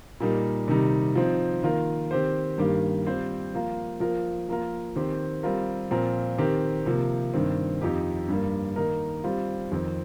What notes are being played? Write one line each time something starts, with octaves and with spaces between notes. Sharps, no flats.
A#2 G3 A#3 D#4
C3 D#3 G3 D#4
F3 C4 D#4
D#3 A#3 F4 A#4
D#3 C4 G4 C5
G2 D#3 G3 A#3 G4
G3 C4 F4 C5
F3 A#3 F4 A#4
F3 A#3 F4 A#4
F3 A#3 F4 A#4
D#3 C4 G4 C5
G3 C4 F4 A#4
A#2 F3 C4 F4 A#4
D#3 C4 G4 A#4
C3 F3 A#3
G2 D#3 C4
F2 F3 D#4 G4
G2 G3 A#3
D#3 A#3 D#4 A#4
G3 C4 F4
F2 D#3 C4